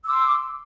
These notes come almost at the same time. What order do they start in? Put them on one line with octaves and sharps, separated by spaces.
E6 D6 C6